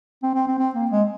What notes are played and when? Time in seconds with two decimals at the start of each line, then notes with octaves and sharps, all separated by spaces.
0.23 C4
0.35 C4
0.47 C4
0.59 C4
0.75 A#3
0.91 G#3